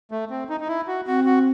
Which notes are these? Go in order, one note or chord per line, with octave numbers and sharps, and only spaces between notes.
A3
C4
D#4
D#4
E4
F#4
C4 F#4
F#4